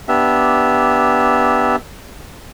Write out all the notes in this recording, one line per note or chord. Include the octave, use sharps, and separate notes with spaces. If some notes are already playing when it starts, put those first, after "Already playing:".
B3 D4 G4 E5